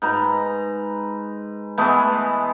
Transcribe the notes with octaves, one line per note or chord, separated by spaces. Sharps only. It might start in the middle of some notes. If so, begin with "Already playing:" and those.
G#2 B4 A#5
E3 G#3 A3 B3